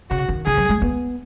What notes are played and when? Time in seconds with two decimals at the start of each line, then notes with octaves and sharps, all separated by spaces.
0.10 C#3 F#4
0.29 D#3
0.46 C#3 G#4
0.57 F#3
0.69 G#3
0.82 B3